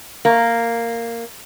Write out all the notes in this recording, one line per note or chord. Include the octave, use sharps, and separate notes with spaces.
A#3